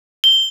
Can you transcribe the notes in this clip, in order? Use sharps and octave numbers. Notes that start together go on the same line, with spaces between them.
G7